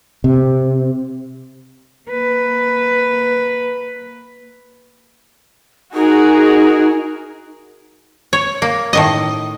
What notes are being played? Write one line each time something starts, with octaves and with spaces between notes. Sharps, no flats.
C3
A#3 B4
D#4 F#4 G#4 A#4
C#5
A#3
A2 D#3 D#5